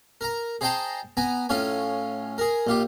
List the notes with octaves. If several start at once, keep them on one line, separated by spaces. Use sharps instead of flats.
A#4 A#5
G#4 C5 D#5 G5 A5 A#5
B3 G#5 A#5
A2 C#4 F4 C#5 G#5
G#4 A#4
A#1 F4 G4